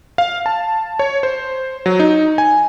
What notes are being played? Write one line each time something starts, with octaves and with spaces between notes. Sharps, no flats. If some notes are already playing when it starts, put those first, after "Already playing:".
F5
A5
C#5
C5
F#3
D#4
G#5